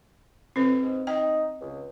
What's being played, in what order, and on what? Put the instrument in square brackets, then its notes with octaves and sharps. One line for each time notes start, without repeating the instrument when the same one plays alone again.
[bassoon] F2 [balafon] C4 B4
[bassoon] G#2
[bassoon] D#4 [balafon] G5
[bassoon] C#2